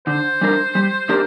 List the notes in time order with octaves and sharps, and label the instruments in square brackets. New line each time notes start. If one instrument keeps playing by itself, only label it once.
[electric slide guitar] D3 [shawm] C5
[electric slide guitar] G3 D4 A#4
G3
D4 G4 A#4